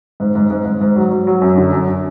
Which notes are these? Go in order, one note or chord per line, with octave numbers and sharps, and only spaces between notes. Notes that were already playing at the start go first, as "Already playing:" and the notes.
G#2
G#2
G#2
G#2
G#2
F#3
F#3
F#3
F#2
D3
F#2